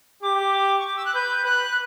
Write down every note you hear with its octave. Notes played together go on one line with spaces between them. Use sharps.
G4 D6
C#6
D6
E6
F#6
B4 G6
B4 F#6